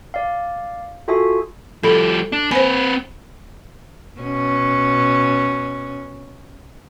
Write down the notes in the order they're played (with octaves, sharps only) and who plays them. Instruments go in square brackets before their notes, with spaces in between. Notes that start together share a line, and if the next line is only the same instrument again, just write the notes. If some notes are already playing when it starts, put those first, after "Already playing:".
[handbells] D5 F5
F4 F#4 G#4 A4 E5 G#5
[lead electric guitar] F3 G3 [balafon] A4 B5
[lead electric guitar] D4
[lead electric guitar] C4 B4 [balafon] C5 G#5
[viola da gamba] B2 C#4